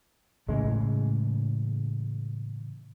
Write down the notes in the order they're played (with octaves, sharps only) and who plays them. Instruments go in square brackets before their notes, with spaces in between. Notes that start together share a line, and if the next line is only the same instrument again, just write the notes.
[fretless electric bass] A2 C#3 E3 G#3